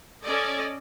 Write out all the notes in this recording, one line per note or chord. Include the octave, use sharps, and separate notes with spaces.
C#4 A4 D5 D#5